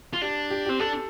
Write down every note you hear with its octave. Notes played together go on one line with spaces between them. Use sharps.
F4
D4 G4
G4
G4
C4
D4 A4